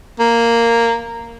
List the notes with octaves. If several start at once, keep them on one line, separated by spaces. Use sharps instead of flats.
A#3